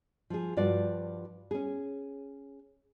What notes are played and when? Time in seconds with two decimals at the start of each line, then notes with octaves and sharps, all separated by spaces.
0.30 F3 G#4
0.57 G2 F3 F4 F#4 D5
1.51 C#4 G#4